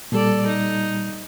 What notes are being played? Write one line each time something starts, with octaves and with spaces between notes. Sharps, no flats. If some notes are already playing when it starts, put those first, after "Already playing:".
A#2 G3 A4 D5
D#4